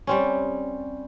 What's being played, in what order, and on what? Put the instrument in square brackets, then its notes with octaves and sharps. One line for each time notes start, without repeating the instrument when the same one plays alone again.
[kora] G3 C4 C#4